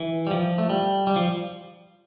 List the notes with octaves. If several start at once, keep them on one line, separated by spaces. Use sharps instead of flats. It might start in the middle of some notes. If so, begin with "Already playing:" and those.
Already playing: E3
G3
F3
A3
G3
G3
F3